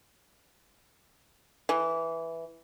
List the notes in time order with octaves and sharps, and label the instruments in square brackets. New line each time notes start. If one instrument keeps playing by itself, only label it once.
[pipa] E3